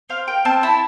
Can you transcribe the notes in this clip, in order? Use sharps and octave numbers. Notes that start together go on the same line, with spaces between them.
C4 F5
A#4 G5
C4 A5
E4 A5